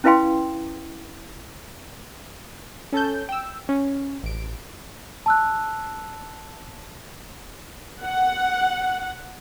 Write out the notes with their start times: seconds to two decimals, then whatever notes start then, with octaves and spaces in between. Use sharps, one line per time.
0.04 C#4 E4 B4 F5 G5 C6
2.93 C#4 A4 A5 G6
3.29 G5 E6
3.69 C#4
4.23 A1 D7
5.26 A5 E6 F#6
8.04 F#5